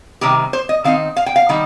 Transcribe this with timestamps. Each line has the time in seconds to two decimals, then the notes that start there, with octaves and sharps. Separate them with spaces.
0.21 C3 D#3 G3 C4 G4
0.53 C5
0.69 D#5
0.84 D#3 C4 D#4 F5
1.16 F5
1.26 G5
1.36 F5
1.49 D#3 G3 D#4